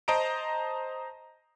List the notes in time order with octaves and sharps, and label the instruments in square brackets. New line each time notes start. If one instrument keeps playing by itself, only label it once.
[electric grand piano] C5 D#5 A5 A#5 D7